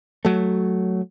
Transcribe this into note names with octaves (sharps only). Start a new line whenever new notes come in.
F#3 A3